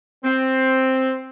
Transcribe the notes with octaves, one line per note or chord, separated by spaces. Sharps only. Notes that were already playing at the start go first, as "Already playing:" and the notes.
C4